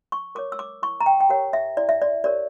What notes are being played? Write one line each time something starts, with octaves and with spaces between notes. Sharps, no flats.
C#6
A#4 C#5 D6
E6
D6
E4 C#6
A#5
G5
G5
G4 A#4 C#5 F#5
E5
E4 D5
E5
D5
G4 A#4 C#5 D5